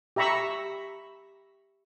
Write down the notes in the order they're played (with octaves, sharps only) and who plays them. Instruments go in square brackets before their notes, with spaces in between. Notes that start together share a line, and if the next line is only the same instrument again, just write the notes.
[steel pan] G4 E5 A#5 B5 C#6 E6